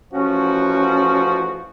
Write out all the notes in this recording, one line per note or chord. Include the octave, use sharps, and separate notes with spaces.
A1 F3 C#4 F#4